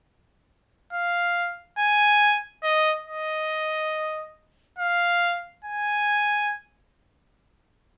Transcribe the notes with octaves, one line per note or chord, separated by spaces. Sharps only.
F5
G#5
D#5
D#5
F5
G#5